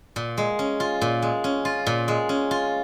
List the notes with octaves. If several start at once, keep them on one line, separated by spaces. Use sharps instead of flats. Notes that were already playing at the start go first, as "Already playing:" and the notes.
A#2
G#3
C#4
F4
A#2
G#3
C#4
F4
A#2
G#3
C#4
F4